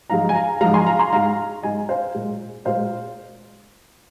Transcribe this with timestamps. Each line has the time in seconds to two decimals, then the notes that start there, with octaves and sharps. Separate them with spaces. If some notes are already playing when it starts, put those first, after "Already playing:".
0.10 G#2 F3 G#3 F5 A#5
0.29 G#5
0.35 F5 A#5
0.61 G#2 F3 G#3 F5 A#5
0.74 G#5 C6
0.86 F5 A#5
0.99 G#5 C6
1.13 G#2 G#3 F5 A#5
1.63 G#2 G#3 D#5 G#5
1.89 C5 F5
2.15 A#2 G#3
2.65 A#2 G#3 C5 F5